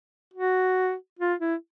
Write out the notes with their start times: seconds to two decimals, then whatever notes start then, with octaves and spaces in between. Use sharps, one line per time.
0.34 F#4
1.19 F4
1.40 E4